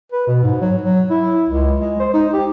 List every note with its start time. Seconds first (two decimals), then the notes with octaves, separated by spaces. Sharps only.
0.12 B4
0.27 B2
0.43 G#2
0.61 F#3
0.81 F#3
1.10 E4
1.49 C#2
1.80 G#3
2.00 C5
2.14 D#4
2.33 G4